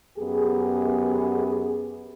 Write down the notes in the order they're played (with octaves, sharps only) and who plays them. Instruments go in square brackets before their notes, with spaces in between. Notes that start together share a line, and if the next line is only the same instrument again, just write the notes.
[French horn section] F#2 B3 G4 G#4